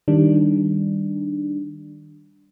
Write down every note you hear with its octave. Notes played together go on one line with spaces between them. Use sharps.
D#3 G3 D4